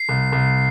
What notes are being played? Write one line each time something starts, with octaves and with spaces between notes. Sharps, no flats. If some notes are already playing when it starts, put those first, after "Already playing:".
Already playing: C7
C2
C2